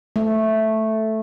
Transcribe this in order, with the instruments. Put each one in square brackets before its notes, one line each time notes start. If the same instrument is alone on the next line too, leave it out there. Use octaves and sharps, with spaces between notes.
[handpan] A3